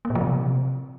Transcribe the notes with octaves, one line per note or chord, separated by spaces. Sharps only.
A#3
A#2
F3
C3